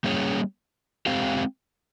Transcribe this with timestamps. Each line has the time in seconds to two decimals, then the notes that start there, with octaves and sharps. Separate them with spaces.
0.04 G3 A#3 C#4 G#4 C#5
1.06 G#3 C4 G4 C5 F5